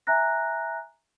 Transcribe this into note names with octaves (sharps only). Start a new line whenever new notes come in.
E5 G#5 A#5 F#6 A#6